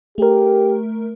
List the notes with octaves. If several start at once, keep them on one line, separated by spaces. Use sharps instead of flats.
A3 G4 A#4